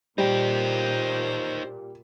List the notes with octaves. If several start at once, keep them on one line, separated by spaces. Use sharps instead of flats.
A#2 G3 D#4 G4 C5